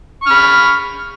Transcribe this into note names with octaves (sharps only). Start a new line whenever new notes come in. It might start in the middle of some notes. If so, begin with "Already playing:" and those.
B5 C#6 F6